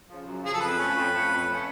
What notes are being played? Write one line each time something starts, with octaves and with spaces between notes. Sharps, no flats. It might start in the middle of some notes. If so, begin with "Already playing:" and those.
C#3 F3
F#2
C#3 F3 G#4
A4
F2 B4
F3 A3 C#4
F2
F3 A3 C#4
F2
F3 A3 C#4